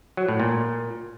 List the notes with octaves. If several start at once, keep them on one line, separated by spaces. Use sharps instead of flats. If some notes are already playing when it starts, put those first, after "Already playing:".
F#3
A2
A#2